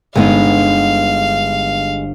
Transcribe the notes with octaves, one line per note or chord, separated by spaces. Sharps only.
G1 G#3 B3 D#4 F5